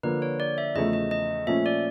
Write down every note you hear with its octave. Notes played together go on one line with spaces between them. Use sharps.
D3 F3 A#3 B4
C#5
D5
E5
E2 C#3 F3 A3 D#5
D#5
D#5
A#2 F3 A3 C#4 E5
D5